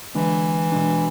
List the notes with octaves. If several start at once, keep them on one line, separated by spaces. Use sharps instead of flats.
D3 E3 G#3 D4
B2 G#3 D4